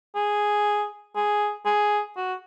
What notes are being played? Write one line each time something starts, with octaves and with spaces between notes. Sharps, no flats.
G#4
G#4
G#4
F#4